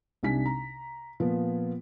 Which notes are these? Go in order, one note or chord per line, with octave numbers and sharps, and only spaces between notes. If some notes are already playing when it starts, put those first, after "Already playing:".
C2 C3 D4 D#4 G#5 B6
A#5
A#2 F3 B3